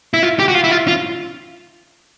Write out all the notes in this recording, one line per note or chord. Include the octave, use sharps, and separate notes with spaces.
E4
F4
G4
F#4
F4
E4
F4
F4